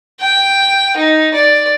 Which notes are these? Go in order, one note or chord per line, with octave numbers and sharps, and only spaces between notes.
G5
D#4
D5